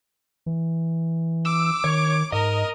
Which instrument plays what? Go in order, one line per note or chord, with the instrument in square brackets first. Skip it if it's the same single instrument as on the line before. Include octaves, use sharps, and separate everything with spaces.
[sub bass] E3
[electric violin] D6 [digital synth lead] E6
[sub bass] D#3 [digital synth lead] C#5
[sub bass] G#2 [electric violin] A#4 [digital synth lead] D#5